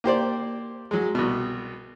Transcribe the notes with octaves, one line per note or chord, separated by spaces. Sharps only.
A#3 G4 C5 D5
F#3 G#3
C2 B2